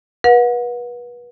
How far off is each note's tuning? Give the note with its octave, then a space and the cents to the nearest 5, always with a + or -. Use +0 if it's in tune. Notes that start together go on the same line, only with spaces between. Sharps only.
B4 -30 F#5 -35